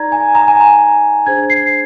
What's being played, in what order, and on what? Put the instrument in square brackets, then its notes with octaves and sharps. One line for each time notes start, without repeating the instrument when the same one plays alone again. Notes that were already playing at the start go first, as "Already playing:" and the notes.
Already playing: [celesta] D#4 G#4 D5 A#5 G#6
G#5
A#5
G#5
A#5
D4 G#4 C5 G#6
C7